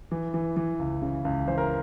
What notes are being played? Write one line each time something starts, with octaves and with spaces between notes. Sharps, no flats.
E3
E3
E3
C#2
C#3
C#2
E3 C5
A#4